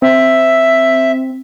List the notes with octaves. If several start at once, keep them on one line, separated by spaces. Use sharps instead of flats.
C4 E5